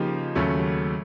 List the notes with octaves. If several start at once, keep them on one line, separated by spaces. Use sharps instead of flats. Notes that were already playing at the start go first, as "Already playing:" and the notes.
Already playing: C#3 F3 A#3 D#4 G4
D#2 C#3 F#3 A3 C#4